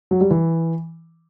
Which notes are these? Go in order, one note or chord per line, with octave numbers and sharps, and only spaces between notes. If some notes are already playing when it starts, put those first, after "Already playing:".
F#3
G3
E3